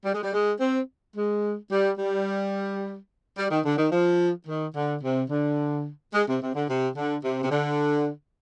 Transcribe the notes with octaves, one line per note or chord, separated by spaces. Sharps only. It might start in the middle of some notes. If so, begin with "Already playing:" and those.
G3
G#3
G3
G#3
C4
G#3
G3
G3
G3
D#3
D3
D#3
F3
D#3
D3
C3
D3
G#3
C3
C3
D3
C3
D3
C3
C3
D3